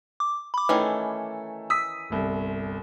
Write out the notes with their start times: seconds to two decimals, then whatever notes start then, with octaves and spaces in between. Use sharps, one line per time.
0.20 D6
0.54 B5 D6
0.69 D#3 E3 A3 C#4 A4
1.70 D#6 E6 B6
2.10 G1 C2